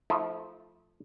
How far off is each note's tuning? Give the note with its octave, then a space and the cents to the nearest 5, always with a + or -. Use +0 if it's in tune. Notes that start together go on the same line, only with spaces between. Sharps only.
F3 +0 A3 +0 E4 -45